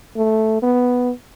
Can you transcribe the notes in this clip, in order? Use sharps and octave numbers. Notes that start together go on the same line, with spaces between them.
A3
B3